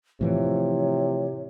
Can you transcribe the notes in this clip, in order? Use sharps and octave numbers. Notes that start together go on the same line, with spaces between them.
A2 C3 E3 F3 C#5